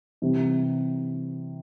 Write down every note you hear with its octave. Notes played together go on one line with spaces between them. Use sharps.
C3 E3 G3 C4